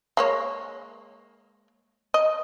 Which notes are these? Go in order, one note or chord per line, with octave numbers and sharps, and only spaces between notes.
G#3 A#3 C#5
D#5